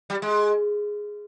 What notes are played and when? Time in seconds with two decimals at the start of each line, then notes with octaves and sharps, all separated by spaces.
0.10 G3
0.22 G#3